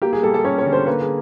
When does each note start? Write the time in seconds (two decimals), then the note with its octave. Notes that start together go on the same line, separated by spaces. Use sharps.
0.02 A#3 G4
0.13 G#4
0.23 G3 A4
0.34 A4
0.44 C#4 C#5
0.58 C#5
0.66 D3
0.72 C5
0.86 A#3 B4
1.01 G#4